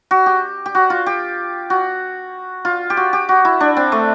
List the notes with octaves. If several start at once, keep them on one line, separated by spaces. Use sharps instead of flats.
F#4
G4
G4
F#4
F4
G4
F#4
F4
G4
F#4
G4
F#4
E4
D4
C4
A3